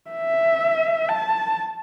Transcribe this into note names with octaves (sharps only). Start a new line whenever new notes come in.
E5
A5